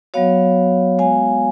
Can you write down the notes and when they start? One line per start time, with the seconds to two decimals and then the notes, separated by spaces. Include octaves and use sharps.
0.14 F#3 B3 F#4 C#5 F5
0.98 G#3 B3 F#4 F5 G#5